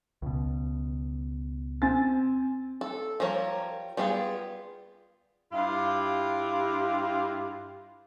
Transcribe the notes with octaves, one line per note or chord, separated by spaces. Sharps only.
C#2 B2
C4 G#5 A6
A4
F3 G3 A#4 C#5
G3 B3 D4 F4 G#4
G2 E4 F4 G4 F5